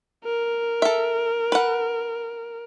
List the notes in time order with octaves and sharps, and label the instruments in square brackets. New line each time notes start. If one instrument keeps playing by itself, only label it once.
[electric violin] A#4
[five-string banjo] A4 E5
B4 F#5